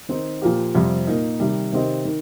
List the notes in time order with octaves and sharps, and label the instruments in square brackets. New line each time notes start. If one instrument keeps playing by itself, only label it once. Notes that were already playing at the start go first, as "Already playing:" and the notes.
[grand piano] D#3 C4 D#4
A#2 F3 A#3 G4
F2 C3 G3 C4
A#2 A#3 D#4
C3 D#3 G3
C3 D#3 C4 G4 D#5
D#3